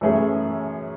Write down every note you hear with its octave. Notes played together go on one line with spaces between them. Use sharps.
F#2 E3 A3 C#4 G#4